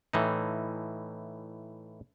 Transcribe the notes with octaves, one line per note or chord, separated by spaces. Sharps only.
A2 E3 D#4